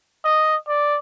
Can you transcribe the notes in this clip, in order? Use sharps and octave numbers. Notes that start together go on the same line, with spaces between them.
D#5
D5